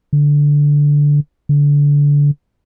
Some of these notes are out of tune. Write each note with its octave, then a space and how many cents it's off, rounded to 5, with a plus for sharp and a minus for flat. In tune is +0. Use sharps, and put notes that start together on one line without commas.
D3 -10
D3 -25